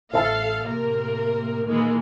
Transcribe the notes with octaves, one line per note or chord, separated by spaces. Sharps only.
A1 A4 C5 E5 F5 A5
A2 C3 A#3 A#4
A#2 D#3 E3 G#3 A#3